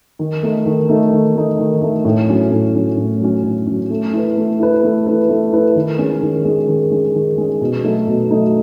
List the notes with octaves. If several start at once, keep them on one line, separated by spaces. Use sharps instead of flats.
D#3
A3 D#4
D#3
A3 D#4
D#3
A3 D#4
D#3
A3 D#4
A2
F#3 C#4
A2
F#3 C#4
A2
F#3 C#4
A2
F#3 C#4
A3
E4 B4
A3
E4 B4
A3
E4 B4
A3
E4 B4
D#3
G#3 C#4
D#3
G#3 C#4
D#3
G#3 C#4
D#3
G#3 C#4
B2
F#3 A3 D#4
B2
F#3 A3 D#4